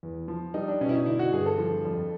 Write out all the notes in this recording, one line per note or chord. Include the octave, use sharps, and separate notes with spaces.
E2
F3
G3 D#4
D4
B2 C#4
E4
D#4
D3 E4
F#4
G2 G#4
A4
F3
F2